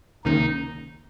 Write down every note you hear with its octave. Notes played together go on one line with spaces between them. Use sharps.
C#2 C3 D#3 A#3 C#4 D#4